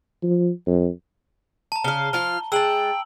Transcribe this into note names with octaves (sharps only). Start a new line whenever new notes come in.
F3
F2
A5 A#5
C#3 F5 G7
F3 F4 F6
G#3 G5 A5 E6 F#7